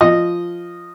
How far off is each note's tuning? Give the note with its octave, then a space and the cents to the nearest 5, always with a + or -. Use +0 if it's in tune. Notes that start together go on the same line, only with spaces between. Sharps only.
F3 -5 D#5 -10